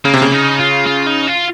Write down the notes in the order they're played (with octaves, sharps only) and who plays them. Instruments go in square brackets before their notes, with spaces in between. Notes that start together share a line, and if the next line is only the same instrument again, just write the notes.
[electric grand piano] C#3 [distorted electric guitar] A#3
[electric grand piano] C3
C#3
[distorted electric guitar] D#4
F4
F4
D#4
F4